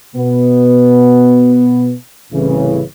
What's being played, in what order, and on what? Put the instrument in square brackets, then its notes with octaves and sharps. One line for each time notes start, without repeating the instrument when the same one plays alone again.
[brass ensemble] B2 B3
C2 A2 C#3 E3